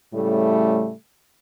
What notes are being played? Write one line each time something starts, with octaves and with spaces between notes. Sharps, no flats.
A2 C#3 G3 A3